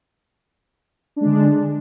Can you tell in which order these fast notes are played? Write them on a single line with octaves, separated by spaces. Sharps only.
D4 G#3 D3